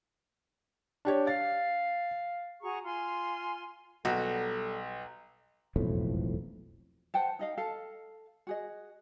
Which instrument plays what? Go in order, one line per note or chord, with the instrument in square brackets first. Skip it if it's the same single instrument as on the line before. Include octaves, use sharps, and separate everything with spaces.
[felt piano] D4 G4 C#5
[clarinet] F5 [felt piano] A6
[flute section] F#4 G#4 A#5 C#6
F4 G#5 C6
[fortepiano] B1 [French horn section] G3 A4 [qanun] F#4
[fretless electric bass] E1 B1 F2 A2
[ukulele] C5 F#5 G5 A5
D#4 D#5 F5
A4 F5 A5
F#4 G#4 D#5